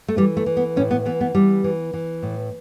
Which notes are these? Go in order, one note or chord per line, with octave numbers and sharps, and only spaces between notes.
A3
E3 G3
A3
E3
B3
A2 C#4
B3
E3 B3
B3
E3 G3
E3
E3
A2